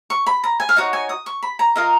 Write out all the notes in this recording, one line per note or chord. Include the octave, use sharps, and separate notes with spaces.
C#6
B5
A#5
G#5
F5
D#4 F#4 C#5 F#5
G#5
D#6
C#6
B5
A#5
F4 A#4 D#5 A#5